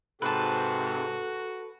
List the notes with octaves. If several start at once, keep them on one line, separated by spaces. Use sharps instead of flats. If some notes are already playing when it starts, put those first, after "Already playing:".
G#2 C3 F#4 A4 B4 A5